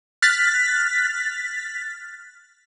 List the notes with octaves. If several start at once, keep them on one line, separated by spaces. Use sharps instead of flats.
F6 F#6 A6 B6